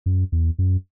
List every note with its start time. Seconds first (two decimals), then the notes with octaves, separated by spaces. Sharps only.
0.06 F#2
0.32 E2
0.59 F#2